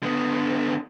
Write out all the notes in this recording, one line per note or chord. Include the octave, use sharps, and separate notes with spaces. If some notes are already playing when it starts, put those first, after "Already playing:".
D3 B3